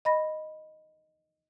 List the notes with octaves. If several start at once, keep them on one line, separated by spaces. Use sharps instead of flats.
D#5 B5 A#6